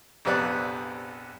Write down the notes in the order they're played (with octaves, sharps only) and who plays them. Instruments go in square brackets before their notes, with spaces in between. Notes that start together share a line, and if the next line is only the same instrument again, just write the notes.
[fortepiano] A#1 F2 C3 B3 D5 F#6